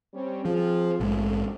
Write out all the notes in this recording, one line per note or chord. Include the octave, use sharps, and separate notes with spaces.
G3 C4 C#4
F3 C4 F4 G#4
A#1 G#2 G#3 A3